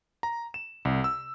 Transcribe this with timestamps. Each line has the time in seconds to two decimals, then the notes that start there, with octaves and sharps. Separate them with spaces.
0.23 A#5
0.54 E7
0.85 C2
1.04 E6